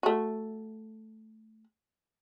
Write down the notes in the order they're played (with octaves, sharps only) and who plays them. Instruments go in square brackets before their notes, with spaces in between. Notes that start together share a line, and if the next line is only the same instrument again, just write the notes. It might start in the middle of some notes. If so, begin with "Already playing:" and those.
[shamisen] A3 F#4